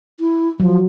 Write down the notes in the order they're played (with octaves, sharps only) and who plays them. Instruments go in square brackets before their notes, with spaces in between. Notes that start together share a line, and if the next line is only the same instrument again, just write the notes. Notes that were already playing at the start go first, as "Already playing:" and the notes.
[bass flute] E4
[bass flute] F3 [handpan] F#3